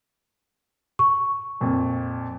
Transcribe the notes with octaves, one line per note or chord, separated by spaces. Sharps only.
C#6
F2 A#2